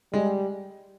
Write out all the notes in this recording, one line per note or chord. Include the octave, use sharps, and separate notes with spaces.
G3 G#3